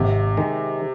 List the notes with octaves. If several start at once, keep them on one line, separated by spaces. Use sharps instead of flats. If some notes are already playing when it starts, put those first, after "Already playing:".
Already playing: G#1 C3
D#3 G#3